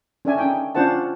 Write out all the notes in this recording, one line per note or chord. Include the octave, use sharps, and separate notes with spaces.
C#4 D4 A4 D5 E5 G#5
C#4 D#4 G5
C#4 D4 F4 C5 F#5 A5